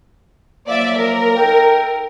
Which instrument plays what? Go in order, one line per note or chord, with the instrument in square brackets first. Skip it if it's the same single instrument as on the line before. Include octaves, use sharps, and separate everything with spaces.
[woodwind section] F3 F#3 A#3 [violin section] D5 E5
[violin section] A#4
[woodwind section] D#4 A4 G5